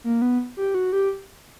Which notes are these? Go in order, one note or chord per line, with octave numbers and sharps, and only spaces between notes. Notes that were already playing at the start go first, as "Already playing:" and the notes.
A#3
B3
G4
F#4
G4